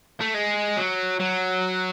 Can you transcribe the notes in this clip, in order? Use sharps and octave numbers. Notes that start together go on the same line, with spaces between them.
A3
G#3
F#3
F#3